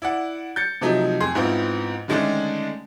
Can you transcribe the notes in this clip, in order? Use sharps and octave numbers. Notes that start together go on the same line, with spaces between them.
E4 D5 F#5
G6 A6 C#7
C3 F3 F#3 A3 D#4
F2 G#4 C6
G#2 B3 C4 E4 F4
D3 D#3 G#3 A3 C#4 D4